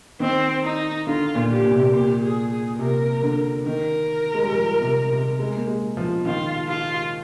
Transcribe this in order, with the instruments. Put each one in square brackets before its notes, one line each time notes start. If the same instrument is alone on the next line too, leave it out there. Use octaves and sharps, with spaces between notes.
[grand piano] D#3 [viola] C4
[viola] D#4
[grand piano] D3 [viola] F4
[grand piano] A#2
[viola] G4
[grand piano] A#2
C3
A#2
[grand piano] A#2 [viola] G4
[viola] G#4
G#4
[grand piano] C3 [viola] A#4
[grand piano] D3
[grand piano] D#3 [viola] A#4
[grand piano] G#3
G3
F3
C3
C3
G#3
A#3
G#3
F3
[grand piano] D#3 [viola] F4
[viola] F4